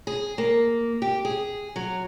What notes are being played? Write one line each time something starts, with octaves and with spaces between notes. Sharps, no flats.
G#4
A#3
G4
G#4
F#3